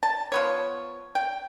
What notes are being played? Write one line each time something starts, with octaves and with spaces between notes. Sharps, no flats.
A5
F3 B3 C#5
G5